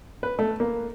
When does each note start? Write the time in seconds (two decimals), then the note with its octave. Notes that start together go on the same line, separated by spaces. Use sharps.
0.23 B4
0.39 A3
0.60 A#3